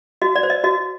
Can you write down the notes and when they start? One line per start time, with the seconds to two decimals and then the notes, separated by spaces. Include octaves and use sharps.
0.22 F#4 D#5
0.36 D5
0.43 C5
0.50 D#5
0.64 F#4 D#5